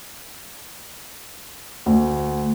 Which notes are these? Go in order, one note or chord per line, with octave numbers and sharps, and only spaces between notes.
D2